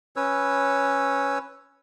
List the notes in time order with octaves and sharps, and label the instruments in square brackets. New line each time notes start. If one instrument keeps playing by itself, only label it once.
[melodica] C#4 B4 C#5 E6